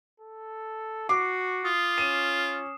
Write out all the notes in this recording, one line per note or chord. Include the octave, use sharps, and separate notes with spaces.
A4
F#4 D6 C7
F4 D#6
C#4 D#7 E7